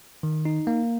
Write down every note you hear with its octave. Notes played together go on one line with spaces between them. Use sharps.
D#3
D#4
A#3